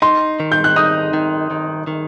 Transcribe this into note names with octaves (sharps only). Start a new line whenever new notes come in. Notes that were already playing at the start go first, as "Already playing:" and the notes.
D#4 C6
D#3
G6
F#6
D#4 D#6
D#3
D#3
D#3